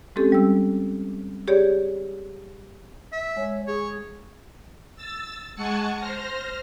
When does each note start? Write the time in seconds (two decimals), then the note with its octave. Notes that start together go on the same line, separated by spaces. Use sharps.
0.16 G#3 C4 C#4 G4 A4
0.32 G3 E6
1.48 G4 G#4 C#5 D5
3.13 E5
3.37 G#3 C#5
3.67 G#4 C#5
4.96 E6 A6
5.56 G#3 F#5 G#5 A5 C#6 C#7
5.97 C5 F6 A#6